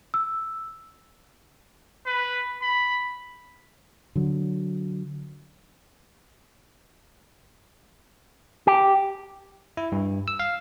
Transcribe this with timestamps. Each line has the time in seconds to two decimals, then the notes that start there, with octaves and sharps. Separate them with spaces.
0.14 E6
2.06 B4
2.61 B5
4.15 D3 F#3
8.67 G4
9.77 E4
9.92 G2
10.28 E6
10.39 F5